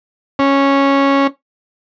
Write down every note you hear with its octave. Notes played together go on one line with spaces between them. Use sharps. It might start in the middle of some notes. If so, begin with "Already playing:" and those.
C#4